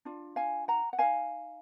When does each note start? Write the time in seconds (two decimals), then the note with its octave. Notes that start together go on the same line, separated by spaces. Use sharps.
0.05 D4 F4
0.36 F5 G#5
0.68 F#5 A#5
0.93 F#5
0.99 D#4 A#4 F5 G#5